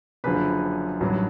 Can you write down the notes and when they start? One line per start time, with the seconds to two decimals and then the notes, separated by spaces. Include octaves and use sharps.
0.24 F#1 F#2 D3 F3 B4 B5
1.00 A1 G2 D#3 F#3